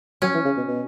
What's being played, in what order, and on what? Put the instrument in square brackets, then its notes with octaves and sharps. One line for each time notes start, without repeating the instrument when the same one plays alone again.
[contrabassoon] F#3 [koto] C#4
[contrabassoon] E3
C#3
B2
B2